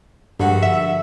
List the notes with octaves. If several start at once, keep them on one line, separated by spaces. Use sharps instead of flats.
A#1 G2 D3 F#4
E5